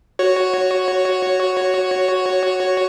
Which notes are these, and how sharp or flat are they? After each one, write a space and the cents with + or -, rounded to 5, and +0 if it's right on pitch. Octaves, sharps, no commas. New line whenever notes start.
F#4 +0 C#5 +0